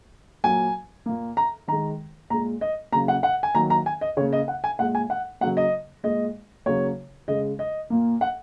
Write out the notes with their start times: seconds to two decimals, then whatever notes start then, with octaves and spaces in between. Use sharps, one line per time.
0.44 A#2 F#3 A#3 G#5
1.06 A#2 A#3
1.37 A#5
1.68 D#3 G#3 A#5
2.30 A#2 G#3 A#5
2.61 D#5
2.92 C#3 F#3 A#3 A#5
3.08 F#5
3.23 F#5
3.43 G#5
3.55 D#3 F#3 A#3 A#5
3.70 A#5
3.86 G#5
4.01 D#5
4.17 C#3 C#5
4.21 A#3
4.33 D#5
4.48 F#5
4.64 G#5
4.79 A#2 G#3 F#5
4.95 G#5
5.10 F#5
5.41 C#3 F#3 A#3 F#5
5.57 D#5
6.03 A#2 G#3 D#5
6.66 C#3 F#3 A#3 C#5
7.28 C#3 G#3 D#5
7.59 D#5
7.90 A#2 A#3
8.21 F#5